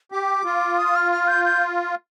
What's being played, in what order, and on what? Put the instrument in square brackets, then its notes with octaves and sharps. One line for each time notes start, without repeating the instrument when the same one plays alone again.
[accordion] G4 [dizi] D6
[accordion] F4
[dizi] D#6
F6
F6
G6
G6